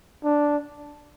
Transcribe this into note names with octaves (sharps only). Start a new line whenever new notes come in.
D4